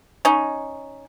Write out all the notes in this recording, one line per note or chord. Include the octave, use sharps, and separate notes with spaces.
C#4 D#4